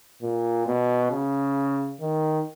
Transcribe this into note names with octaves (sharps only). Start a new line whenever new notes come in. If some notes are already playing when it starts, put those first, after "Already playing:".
A#2
B2
C#3
D#3